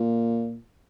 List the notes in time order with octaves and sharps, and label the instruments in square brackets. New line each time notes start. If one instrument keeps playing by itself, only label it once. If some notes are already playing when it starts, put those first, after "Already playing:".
Already playing: [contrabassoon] A#2